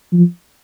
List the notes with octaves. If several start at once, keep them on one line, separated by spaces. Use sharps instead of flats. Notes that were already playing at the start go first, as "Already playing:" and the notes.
F3